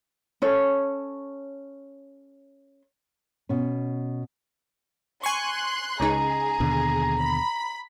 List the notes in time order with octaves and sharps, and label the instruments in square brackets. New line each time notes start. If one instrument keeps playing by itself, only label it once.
[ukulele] C#4 A4 C#5
[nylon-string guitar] B2 C#4
[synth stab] G#5 C#6 [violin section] C6 F#6
[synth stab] C#2 C#3 D#4 [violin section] G#4 [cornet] A#5
[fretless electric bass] D#2 B2 D3
[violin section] B5